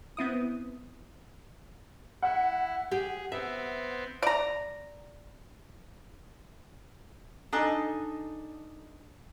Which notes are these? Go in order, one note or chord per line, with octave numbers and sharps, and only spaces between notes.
B3 C4 E4 D#6
E4 F#5
G4 G#4
B3 C4 E5
D5 A#5
D4 D#4 A4 D#5 G#5